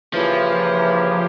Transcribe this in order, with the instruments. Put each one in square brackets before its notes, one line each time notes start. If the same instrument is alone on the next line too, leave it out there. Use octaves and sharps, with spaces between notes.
[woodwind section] C#3 E3 A#3 E4 G4 [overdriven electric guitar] F3